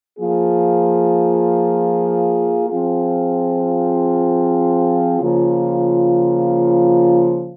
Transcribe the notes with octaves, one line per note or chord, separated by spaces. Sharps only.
F3 A#3 F4 G#4
F3 C4 F4 G#4
C#3 F3 A#3 F4